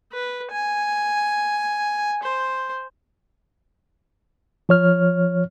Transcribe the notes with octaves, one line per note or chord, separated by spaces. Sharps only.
B4
G#5
C5
F3 C#5 F6